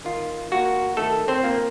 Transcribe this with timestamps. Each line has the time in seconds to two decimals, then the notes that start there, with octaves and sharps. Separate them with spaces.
0.05 D#3 F4
0.51 A#3 F4 F#4
0.97 D#3 A3 A4
1.28 C4 C5
1.43 A#3 F4